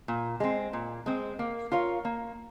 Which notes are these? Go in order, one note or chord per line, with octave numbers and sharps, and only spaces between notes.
A#2
G#3 C4
A#2
G#3 C4
A#3
F4 A#4 C#5 F5
A#3